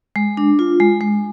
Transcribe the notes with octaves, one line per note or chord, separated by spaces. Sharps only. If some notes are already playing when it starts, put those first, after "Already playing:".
G#3
D4
F4
G#3
G#3